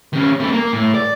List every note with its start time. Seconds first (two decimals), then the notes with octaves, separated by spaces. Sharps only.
0.13 D#3 C#4
0.40 B3 A4
0.53 A#3
0.73 A2
0.95 D5